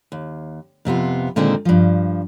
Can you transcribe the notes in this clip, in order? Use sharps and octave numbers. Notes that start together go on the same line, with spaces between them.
D#2
F2 C3 B3 F4
A#2 D3 D#3 G#3 C4
G2 F3